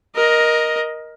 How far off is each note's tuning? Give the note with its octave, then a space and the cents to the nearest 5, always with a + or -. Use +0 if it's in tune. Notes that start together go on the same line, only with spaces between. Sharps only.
A#4 +15 D#5 +0